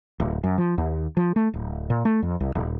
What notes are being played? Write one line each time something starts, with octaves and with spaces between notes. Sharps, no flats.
D1
F#2
F3
D#2
F3
A3
D1
A#2
A3
F2
C2
D#1